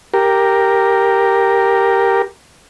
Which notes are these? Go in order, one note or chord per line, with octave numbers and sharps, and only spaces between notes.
G4 A#4